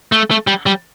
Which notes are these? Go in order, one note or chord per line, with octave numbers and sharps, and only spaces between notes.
A3
A3
G3
G3